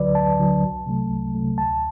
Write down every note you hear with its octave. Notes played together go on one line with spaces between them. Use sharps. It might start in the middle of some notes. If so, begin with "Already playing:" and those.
Already playing: D2 D3 F#3 B4 D5
D2 A5
D3 F#3
C2
C3 F#3 A3
C2
C3 F#3 A3
D2 A5